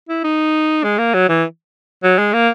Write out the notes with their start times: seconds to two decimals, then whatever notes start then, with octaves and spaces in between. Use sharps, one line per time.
0.09 E4
0.24 D#4
0.84 G#3
0.98 A#3
1.14 F#3
1.29 E3
2.03 F#3
2.18 G#3
2.33 A#3